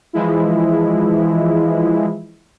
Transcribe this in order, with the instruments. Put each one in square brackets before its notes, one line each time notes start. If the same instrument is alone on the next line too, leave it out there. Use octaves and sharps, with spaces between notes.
[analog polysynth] E3 F3 G#3 E4